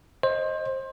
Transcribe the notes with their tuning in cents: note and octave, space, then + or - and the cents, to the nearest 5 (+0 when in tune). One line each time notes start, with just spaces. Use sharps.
C5 +25 D#5 +0